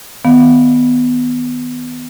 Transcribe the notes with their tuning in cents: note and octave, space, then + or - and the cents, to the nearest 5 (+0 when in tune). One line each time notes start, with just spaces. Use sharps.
D#3 +5 B3 +10 F5 +0